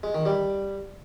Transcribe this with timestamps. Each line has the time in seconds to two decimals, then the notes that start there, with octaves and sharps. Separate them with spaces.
0.03 G#3
0.15 D#3
0.26 G3